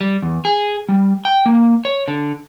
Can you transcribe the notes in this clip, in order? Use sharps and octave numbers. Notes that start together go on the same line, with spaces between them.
G3
E2
G#4
G3
G5
A#3
C#5
D3